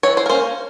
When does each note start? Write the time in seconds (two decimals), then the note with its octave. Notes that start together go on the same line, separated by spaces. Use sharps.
0.03 E3 C#5
0.17 C5
0.26 A#4
0.30 A#3 C#4 C5